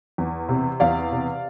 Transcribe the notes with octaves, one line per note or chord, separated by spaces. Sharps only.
E2
C3
E2 D5 F5
C3